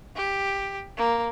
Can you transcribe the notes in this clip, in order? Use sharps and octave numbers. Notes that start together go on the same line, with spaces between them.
G4
A#3